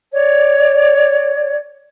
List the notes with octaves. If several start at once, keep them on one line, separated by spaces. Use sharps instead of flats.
C#5 D5